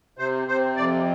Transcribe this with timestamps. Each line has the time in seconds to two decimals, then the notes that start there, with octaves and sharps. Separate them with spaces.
0.18 C3 C5
0.48 C3 C5
0.76 F2 D5